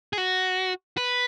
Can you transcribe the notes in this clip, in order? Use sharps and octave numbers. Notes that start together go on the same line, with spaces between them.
G#4
F#4
B4